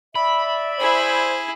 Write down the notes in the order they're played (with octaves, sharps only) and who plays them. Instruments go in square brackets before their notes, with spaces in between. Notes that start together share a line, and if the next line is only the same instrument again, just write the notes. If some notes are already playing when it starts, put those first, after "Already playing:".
[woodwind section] D5 E5 [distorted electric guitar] B5
[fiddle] E4 G#4 [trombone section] C5